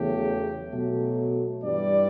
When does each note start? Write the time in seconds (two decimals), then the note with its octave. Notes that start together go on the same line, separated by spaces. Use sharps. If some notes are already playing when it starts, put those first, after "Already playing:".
Already playing: E2 C#3 F#3 A3 G4
0.70 B2 F#3 A3
1.63 G2 E3 G3 D5